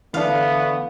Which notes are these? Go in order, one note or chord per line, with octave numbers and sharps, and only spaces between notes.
D3 E3 A3 B3 D4 F5